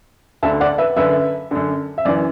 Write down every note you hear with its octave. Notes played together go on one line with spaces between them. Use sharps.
D2 D3 E5 A5
D5 F#5
B4 E5
F#2 D3 B4 E5
F#2 D3
E5
F#2 E3 D5